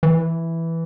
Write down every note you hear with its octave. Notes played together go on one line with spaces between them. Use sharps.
E3